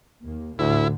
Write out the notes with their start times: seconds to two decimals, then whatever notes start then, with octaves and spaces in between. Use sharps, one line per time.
0.23 D#2 A#3
0.59 D2 A2 D3 E4